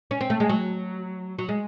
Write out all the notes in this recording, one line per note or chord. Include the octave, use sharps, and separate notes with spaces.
C#4
C4
A3
G#3
F#3
F#3
G#3